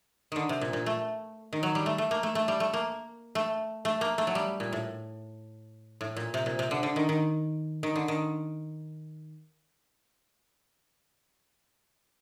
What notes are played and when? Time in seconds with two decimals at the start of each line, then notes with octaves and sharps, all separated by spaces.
0.32 D3 D#3
0.49 C3
0.61 A#2
0.73 A#2
0.86 A3
1.53 D#3
1.63 F#3
1.75 G3
1.86 A3
1.98 A3
2.11 A#3
2.23 A3
2.35 A3
2.48 G3
2.60 A3
2.73 A#3
3.35 A3
3.85 A3
4.01 A#3
4.18 A3
4.27 F#3
4.35 G3
4.60 A#2
4.73 A2
6.01 A2
6.16 A#2
6.34 C3
6.46 A#2
6.59 C3
6.71 D3
6.83 D3
6.96 D#3
7.09 D#3
7.83 D#3
7.96 D3
8.08 D#3